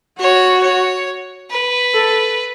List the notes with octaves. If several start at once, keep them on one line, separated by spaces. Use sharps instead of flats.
F#4 C#5
C#5
B4
A4